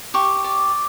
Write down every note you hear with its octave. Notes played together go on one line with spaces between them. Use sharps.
G4 C#6
D5